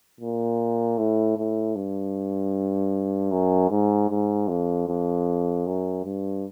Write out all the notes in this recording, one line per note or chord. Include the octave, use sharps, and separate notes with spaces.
A#2
A2
A2
G2
F#2
G#2
G#2
F2
F2
F#2
G2